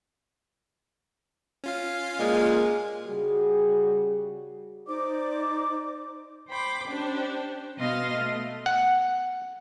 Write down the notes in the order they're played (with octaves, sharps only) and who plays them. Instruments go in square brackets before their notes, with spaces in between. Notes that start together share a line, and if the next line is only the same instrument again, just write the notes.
[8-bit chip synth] C#4 F4 F5
[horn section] A#2 G#3
[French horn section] C#3 G3 F#4 G#4
[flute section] D#4 C5 D5 D6
[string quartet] C5 G5 B5 D6
C#4 D4 G4 C5
B2 B3 D#5 F5 C6 A#6
A3
[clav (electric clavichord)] F#5